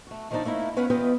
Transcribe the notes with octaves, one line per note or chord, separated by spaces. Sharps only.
A3 F#4
D#3 F3 A#3 D4 D#4 D5
A3 A#3 D#4 E4
B3 C#4 B4 C#5 F5 F#5
E2 B3 F4 B4 D#5 G5